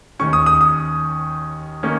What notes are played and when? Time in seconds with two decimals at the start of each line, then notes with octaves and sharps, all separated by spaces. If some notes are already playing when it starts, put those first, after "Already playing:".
0.19 D#2 D#3 C#4 C#6
0.33 D#6
0.46 D#6
0.61 D#6
1.83 D#3 A#3 C#4